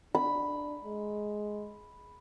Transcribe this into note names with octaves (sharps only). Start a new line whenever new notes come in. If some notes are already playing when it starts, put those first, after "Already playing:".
D4 B5
G#3